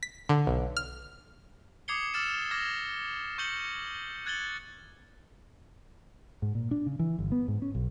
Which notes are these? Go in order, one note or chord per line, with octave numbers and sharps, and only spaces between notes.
B6
D3
B1
F6
D6 D#6 G#6 C7 C#7 G7
D6 E6 F6 A6 C#7 E7
D6 F6 G#6 A#6 E7
C#6 G6 C#7 F#7 G7
F#6 G#6 A6 C#7 F#7 G7
G#2
A#2
D4
C#3
E3
G1
B3
G#2
C#4
B1